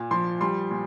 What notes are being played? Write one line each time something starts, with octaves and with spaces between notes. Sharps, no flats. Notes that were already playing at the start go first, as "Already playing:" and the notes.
Already playing: A#2
F3 C6
G3 C6
A#2